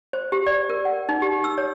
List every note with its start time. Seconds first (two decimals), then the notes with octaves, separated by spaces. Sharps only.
0.13 C5
0.32 G4
0.47 D5
0.70 A#4
0.85 F#5
1.09 D#4
1.22 G4
1.44 E6
1.58 C#5